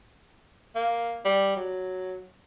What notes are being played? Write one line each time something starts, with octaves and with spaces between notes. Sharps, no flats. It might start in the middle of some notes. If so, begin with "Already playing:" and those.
A#3
G3
F#3